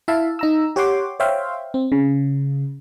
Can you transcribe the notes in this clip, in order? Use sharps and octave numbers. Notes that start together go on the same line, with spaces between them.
E4 E5 F5 A5
D#4 A#5 E6
G4 C#5 F#5 G5 C6 D6
C5 C#5 E5 F5 G5 C6
C4
C#3